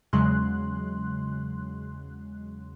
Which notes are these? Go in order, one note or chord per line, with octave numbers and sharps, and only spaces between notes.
E2 C#3 F#3 G#3 C6 F#6